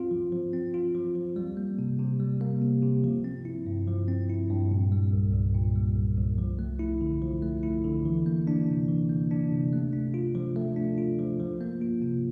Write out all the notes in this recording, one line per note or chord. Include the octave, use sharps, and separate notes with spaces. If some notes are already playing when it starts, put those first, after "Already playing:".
Already playing: C4 F4
F3
F3
C4
F4
F3
F3
G3
A#3
C3
C3
G3
A#3
C3
C3
F3
C4
E4
G2
F3
C4
E4
G2
A#2
G3
C2
C2
A#2
G3
C2
C2
F3
A3
E4
D3
F3
A3
E4
D3
E3
A#3
D4
C3
E3
A#3
D4
C3
A3
D4
F4
F3
A3
D4
F4
F3
F3
A#3
F4
C3